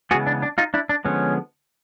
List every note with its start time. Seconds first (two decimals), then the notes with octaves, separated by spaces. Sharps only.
0.11 C#3 E3 G#3 B3 F#4 G#4
0.27 D4
0.42 D4
0.58 D#4 F4
0.74 D4 E4
0.89 D4
1.05 D3 F3 G#3 B3 C#4